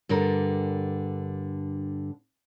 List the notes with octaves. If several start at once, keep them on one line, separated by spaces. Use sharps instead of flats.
G2 D3 G3 A#4